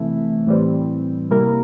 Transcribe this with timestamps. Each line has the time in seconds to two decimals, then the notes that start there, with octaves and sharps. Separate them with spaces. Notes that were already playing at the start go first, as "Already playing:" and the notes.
Already playing: C3 E3 A3 E4
0.47 A2 E3 G3 C4
1.30 C3 G3 A#3 E4 A#4